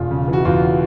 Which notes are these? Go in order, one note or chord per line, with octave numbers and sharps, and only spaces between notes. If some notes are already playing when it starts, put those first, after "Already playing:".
Already playing: E1 F4
C#3
E3
F#4
E2 F4